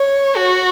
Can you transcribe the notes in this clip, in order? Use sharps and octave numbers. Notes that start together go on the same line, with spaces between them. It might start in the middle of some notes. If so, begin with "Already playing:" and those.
Already playing: C#5
F#4